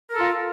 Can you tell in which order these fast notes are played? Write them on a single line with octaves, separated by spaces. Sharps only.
A#4 A4 F4